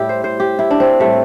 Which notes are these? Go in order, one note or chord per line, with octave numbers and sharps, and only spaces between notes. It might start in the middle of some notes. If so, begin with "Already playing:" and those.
Already playing: A2 G3 E4 G4
C5
C5
G4
E4
D4
C4
A2 G3 A3